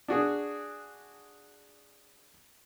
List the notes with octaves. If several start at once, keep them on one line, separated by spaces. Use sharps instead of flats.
D4 F#4 G#4